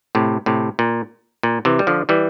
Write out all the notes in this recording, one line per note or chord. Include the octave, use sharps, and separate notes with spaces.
A2 C3
A2 C3
A#2
A#2
C3 E3
G3
D3 F3
E3 G3